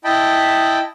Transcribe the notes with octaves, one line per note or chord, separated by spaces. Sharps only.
E4 D#5 G5 A5 B5